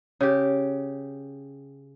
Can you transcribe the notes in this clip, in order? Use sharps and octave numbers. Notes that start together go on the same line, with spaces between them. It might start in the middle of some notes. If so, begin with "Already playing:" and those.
C#3 G4